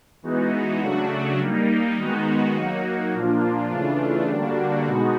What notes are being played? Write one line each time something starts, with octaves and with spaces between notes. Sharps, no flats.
E3 G#3 B3 D#4 F#4
C#3 F#3 A3 D4 F#4
G3 A#3 D#4
D#3 G#3 B3 D#4 F#4
F#3 A#3 D#4 F#4
A#2 F3 A#3 D4 F4
C#3 E3 A3 D4 F4
D3 G3 A#3 D4 F#4
B2 G#3 B3 D#4 F#4